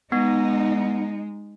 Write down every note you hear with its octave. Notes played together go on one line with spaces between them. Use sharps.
G#3 B3 D#4